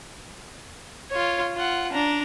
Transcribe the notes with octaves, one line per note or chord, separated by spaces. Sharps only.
F4 C#5
F4 F#5
D4 A#5